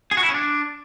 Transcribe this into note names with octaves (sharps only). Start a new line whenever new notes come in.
G#4
F#4
E4
C#4
D4